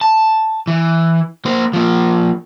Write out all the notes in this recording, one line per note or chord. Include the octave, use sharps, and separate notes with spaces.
A5
E3
A#3 C5
F3 A#3